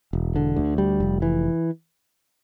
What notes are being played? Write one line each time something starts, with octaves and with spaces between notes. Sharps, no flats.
E1
D3
D2
G3
F1
E3